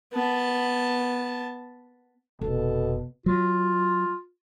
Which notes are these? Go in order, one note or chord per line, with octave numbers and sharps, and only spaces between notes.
B3 A5
F1 B2 A4
F#3 F4